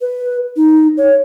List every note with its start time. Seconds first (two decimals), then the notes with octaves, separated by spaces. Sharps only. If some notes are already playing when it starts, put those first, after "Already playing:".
0.01 B4
0.57 D#4
0.97 C#5